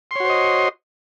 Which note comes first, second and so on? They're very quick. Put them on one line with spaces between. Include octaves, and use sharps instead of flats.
C6 C#5 F#4 C5 D#5